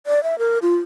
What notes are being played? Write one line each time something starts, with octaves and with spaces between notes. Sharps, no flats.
D5
E5
A#4
F4